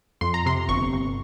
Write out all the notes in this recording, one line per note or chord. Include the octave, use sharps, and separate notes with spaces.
F2 C6
A#5
C3 C6
G1 C#6
G1